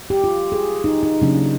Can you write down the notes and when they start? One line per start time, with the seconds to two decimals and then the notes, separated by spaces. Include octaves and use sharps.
0.10 G4
0.24 F4
0.52 G#4
0.84 D#4
1.03 D#4
1.22 C#3 F#3 A#3 C#4 D4